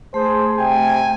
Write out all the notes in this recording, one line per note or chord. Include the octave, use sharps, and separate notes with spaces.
A3 G#4 C5
C3 G5 G#5